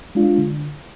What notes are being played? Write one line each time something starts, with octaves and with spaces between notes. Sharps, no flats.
G#3 D4 F4
D3